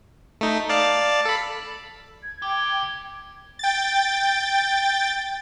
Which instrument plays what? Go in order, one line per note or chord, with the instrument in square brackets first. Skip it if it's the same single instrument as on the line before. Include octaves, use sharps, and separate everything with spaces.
[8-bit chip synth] A3 D#4
D5 F5 A5
A4 B5
[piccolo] G#6
[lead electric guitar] C2 G4 [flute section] G5
[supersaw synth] G5 A6